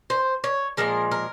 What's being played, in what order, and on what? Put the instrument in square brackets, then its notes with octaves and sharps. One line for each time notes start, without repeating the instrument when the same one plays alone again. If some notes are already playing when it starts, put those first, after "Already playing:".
[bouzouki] C5
C#5
A#2 F3 G#3 A#4
A#4